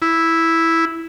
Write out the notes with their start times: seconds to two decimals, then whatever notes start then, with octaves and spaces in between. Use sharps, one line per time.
0.02 E4